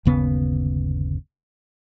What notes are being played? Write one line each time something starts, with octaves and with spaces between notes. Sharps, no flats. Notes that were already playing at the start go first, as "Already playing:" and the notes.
G1 D#2 C#3 B3